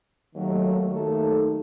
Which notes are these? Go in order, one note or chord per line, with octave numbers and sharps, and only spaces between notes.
D#2 D#3 F#3 A3
D#2 D#3 A3 D#4 A4